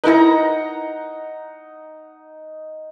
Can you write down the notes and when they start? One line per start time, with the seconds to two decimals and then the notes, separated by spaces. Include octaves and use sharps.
0.04 D#4 E4 A#4 B4 F#5 A#5